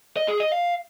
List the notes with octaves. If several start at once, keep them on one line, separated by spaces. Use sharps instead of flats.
D#5
G#4
D#5
F5